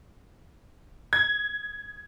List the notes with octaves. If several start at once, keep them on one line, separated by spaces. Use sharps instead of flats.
G#6